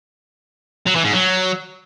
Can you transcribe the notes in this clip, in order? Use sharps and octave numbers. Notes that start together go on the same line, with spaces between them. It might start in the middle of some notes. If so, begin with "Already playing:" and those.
F#3
E3
G#2
F#3